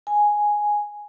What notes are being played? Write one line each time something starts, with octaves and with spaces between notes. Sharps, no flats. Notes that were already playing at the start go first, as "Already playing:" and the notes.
G#5